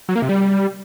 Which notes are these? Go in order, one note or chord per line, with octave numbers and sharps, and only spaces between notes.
F#3
A#3
C3
G3